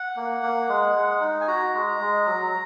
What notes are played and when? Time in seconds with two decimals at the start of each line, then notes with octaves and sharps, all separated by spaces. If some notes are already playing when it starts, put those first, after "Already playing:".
Already playing: F#5
0.16 A#3
0.42 A#3
0.69 G#3
0.95 G#3
1.21 D#4
1.41 G#5
1.48 F#4 A#5
1.74 G#3
2.00 G#3
2.26 F#3